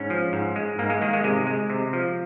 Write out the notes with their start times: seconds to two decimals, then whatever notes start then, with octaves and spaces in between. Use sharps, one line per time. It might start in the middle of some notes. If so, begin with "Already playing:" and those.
Already playing: G#2 C#4
0.10 F3
0.33 G#2
0.56 G#3
0.79 G#2 A#3
0.90 G#3
1.02 D#3 A#3
1.13 G#3
1.24 C3 G#3
1.47 G#3
1.69 C3
1.93 F3